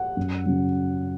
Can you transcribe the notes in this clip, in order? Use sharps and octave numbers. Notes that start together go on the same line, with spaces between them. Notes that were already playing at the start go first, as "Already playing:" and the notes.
Already playing: F#5
F#2
C#3 F#3